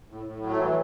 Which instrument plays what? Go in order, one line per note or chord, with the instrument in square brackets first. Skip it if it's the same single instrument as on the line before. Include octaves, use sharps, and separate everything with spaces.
[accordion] A2
A2
F#3
A3
E3 G3